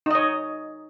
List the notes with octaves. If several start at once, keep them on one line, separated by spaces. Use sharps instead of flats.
D#4 C#5 D#5